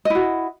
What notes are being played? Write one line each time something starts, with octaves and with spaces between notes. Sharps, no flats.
E4 F#4 D#5